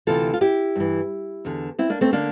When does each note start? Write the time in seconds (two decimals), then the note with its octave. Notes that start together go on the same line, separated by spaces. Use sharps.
0.07 D2 C3 E3 F4 A4
0.33 F4
0.41 E4 G4
0.76 G2 E3
1.45 E2 D3
1.79 C4 E4
1.90 A#3 D4
2.01 A3 C4
2.13 D3 A#3 D4